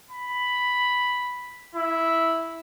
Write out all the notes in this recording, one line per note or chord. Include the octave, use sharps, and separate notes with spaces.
B5
E4